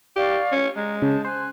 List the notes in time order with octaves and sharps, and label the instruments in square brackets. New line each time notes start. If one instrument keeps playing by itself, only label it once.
[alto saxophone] G4 [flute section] D5 F5 C#6
[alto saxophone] C#4
[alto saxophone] G#3 [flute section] A#5
[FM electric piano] C#3 [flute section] A5 G6
[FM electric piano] C5 [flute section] G#5 F#6